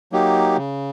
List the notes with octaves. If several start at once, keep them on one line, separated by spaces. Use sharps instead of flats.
F#3 A#3 D#4 G4
C#3